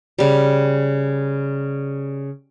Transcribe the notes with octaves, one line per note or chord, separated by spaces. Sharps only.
C#3 G3